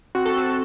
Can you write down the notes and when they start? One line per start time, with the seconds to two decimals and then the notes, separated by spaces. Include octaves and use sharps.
0.15 C4 F#4
0.26 A4
0.37 C4 F#4